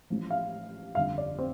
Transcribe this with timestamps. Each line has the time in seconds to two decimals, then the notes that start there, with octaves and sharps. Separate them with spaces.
0.10 A1 A2 F3
0.31 F5
0.95 G1 F2 D3 F5
1.18 D5
1.38 C4